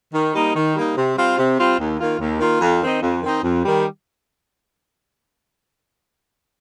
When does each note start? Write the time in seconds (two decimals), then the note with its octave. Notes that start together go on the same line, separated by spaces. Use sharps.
0.13 D#3
0.34 G3 A#3 D#4
0.55 D#3
0.75 G3 A#3 D#4
0.96 C3
1.16 G3 C4 F4
1.37 C3
1.58 G3 C4 F4
1.78 D#2
1.99 D#3 A#3 F4
2.19 D#2
2.40 D#3 A#3 F4
2.61 F2
2.82 D#3 C4 D#4
3.01 F2
3.22 D#3 C4 D#4
3.43 F2
3.64 D#3 G3